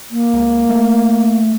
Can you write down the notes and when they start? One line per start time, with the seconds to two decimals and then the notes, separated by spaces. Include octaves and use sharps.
0.11 A#3
0.33 C#2
0.69 A3